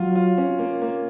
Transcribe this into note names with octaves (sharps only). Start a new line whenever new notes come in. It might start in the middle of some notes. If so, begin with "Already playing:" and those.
Already playing: F#3 F4
F4
C#4
A#3
A#3